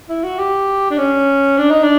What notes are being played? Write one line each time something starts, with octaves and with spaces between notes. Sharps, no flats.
E4
F#4
G4
D4
C#4
D4
D#4
D4